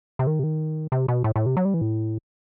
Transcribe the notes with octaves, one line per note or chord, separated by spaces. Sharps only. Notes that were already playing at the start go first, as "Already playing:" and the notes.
C3
D#3
C3
D#3
C3
B2
A2
A2
C3
F#3
G3
E3
A2